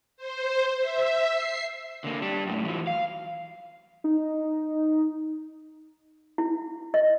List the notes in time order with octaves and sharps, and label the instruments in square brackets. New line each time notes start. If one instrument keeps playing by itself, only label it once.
[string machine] C5
E5
C7
[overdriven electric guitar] D3 A#3
G3 D4
F#2 A2
E3 F#3
F5
[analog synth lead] D#4
[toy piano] E4
D#5